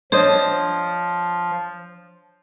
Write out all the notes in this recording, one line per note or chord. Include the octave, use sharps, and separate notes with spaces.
F3 D4 C5 C#5 D#5